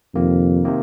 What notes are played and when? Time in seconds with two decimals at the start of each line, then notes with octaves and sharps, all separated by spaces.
0.15 F2 C3 D#3 A#3
0.65 C3 D#3 A#3